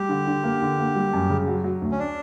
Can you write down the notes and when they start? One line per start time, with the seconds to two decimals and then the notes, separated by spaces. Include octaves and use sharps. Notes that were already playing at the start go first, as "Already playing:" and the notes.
Already playing: G3 G4
0.09 D3
0.27 D3
0.44 A#3
0.62 D3
0.79 A#3
0.96 G3
1.13 F#2
1.30 C#3
1.48 F#3
1.64 F#3
1.82 D2
1.92 C#4
1.99 D4